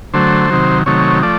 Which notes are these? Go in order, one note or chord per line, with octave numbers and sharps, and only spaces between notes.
D3 F#3 A3 C5
C3 D#3 F#3
C3 D#3 F#3 A3 C#5
F3 A3 D5